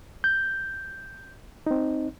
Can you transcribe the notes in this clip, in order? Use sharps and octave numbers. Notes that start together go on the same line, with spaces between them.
G6
C4 D#4